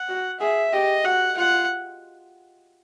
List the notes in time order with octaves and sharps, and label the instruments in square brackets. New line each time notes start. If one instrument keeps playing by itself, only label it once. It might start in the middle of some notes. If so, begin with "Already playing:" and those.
Already playing: [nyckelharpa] F#5
[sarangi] F#4
[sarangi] G#4 [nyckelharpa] E5
[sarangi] G4 [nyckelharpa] D#5
[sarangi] F#4 [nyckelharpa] F#5
[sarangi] F4 [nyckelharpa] F#5